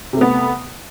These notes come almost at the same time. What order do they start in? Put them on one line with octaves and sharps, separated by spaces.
C3 A3 B3